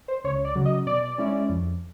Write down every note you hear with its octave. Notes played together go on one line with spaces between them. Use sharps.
C5
C#2 C#5
D5
C#3 F#3
D#5
B2 D5
G#3 C#4 E4
F2